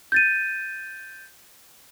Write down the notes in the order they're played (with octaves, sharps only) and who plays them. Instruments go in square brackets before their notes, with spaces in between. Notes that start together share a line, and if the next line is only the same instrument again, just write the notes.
[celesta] G6 A6 D#7